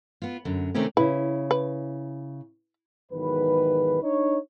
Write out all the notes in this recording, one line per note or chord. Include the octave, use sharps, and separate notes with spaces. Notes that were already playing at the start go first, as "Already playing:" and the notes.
B3 F4
F#2 D3
C3 D#3 A3 C4 C#4 G4
C#3 E4 B4
B4
B1 E2 G#2 D#3 B4
D4 D#4 C#5